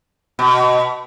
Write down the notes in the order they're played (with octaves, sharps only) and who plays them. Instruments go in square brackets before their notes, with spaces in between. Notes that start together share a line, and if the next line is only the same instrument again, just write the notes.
[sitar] B2